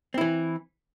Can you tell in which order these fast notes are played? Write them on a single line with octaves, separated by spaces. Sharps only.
C4 E4 E3